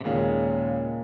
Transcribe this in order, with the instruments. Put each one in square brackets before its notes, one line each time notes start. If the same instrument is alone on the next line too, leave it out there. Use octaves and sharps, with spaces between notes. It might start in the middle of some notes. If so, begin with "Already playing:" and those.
[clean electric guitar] C3
[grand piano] D#2 C#3 G#3 C#4 [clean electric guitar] A#2